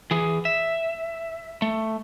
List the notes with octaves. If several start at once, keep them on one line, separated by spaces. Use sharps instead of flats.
E3 G#4
E5
A3